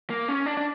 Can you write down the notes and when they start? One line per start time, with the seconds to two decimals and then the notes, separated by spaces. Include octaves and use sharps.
0.10 A#3
0.28 C#4
0.46 D4
0.57 D4